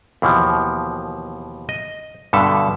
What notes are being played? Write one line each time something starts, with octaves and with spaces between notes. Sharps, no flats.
D#2 B2 E3 F3
D#5
G2 B2 D3 A4 E5 A5